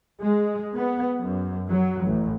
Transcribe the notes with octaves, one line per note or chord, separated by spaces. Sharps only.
G#3
B3
F#2
F#3
A1